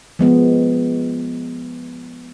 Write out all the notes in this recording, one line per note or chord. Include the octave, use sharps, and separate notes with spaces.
F3 G#3 B3